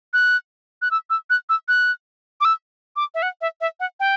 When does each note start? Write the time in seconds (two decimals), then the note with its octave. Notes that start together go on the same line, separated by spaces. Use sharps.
0.13 F#6
0.82 F#6
0.91 E6
1.10 E6
1.30 F#6
1.49 E6
1.68 F#6
2.41 D6
2.45 E6
2.96 D6
3.14 E5
3.22 F#5
3.41 E5
3.61 E5
3.80 F#5
4.00 G5